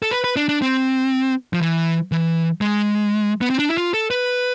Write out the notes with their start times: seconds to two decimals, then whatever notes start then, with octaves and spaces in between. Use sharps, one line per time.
0.03 A4
0.11 B4
0.24 B4
0.36 D4
0.49 D4
0.62 C4
1.53 F3
1.61 E3
2.12 E3
2.61 G#3
3.41 B3
3.50 C4
3.59 D4
3.69 E4
3.78 F4
3.94 A4
4.11 B4